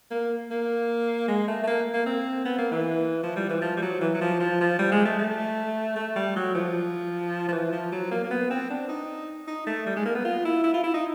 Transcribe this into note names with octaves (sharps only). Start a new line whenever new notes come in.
A#3
A#3
G#3
A3
A3
A#3
A#3
C4
B3
A#3
E3
F3
G3
E3
F3
G3
F#3
E3
F#3
F3
F3
F3
G3
G#3
A3
A3
A3
G3
F#3
F3
F3
E3
F3
F#3
A#3
A#3
B3
C4
D4
D#4
D#4
A3
G3
G#3
A#3
B3
F4
E4
E4
F4
E4
D#4